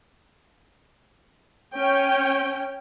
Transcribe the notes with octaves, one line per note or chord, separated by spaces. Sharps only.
C#4 G5